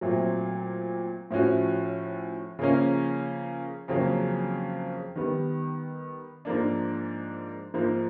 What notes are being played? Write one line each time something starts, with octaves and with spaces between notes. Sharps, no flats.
A#2 F#3 A3 C4
A2 F3 A3 C#4 F#4
C#3 F3 A#3 C#4
F2 C#3 F#3 A#3 C#4
D#3 G3 B3
G#2 F3 A#3 D4
G#2 F3 A#3